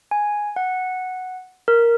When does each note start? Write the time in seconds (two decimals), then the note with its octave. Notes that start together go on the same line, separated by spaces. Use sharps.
0.11 G#5
0.56 F#5
1.68 A#4